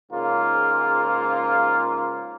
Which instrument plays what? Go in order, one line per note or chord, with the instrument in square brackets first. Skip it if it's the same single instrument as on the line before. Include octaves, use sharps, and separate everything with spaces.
[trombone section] G#2 C#3 A#3 F4